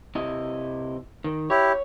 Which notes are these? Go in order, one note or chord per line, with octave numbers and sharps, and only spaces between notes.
C3 E4 D#5
D#3
E4 G4 C#5